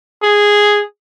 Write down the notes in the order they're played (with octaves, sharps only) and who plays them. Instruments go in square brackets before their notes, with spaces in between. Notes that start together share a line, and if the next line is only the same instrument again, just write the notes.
[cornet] G#4